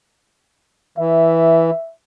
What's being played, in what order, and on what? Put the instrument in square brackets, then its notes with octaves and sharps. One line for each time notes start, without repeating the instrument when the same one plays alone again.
[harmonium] E3 [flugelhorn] E5